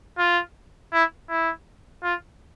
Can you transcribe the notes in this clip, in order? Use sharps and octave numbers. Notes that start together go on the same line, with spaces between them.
F4
E4
E4
F4